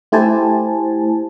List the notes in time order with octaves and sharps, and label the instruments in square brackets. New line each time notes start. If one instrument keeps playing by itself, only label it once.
[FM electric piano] A3 E4 G4 C5 G#5 A5